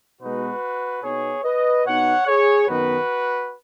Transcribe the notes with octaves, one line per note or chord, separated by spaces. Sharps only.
B2 G#3 B3 D#4 F#4 B4
B2 B3 D#4 G#4 C#5
B4 D#5
B2 B3 D#4 C#5 F#5
G#4 C#5
F#2 D#3 B3 D#4 F#4 B4